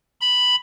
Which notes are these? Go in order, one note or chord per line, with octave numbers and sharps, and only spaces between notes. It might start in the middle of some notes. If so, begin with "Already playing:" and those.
B5